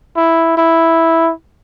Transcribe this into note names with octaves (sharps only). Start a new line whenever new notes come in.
E4
E4